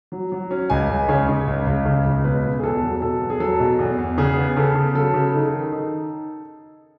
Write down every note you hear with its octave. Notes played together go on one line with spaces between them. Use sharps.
F#3
F#3
C#4
C#2 G#5
C#2
C#3 C#5
C#3
C#2
C#2
C#3
C#2
B2 B4
B2
G#4
E2 A4
F#3
B2 A4
E2
G#4
F#3 A4
B2
E2
E2
C#3 G#4
B3
C#3 A4
C#3
F#3 A4
C#3
D#4 A4
D#3
D#4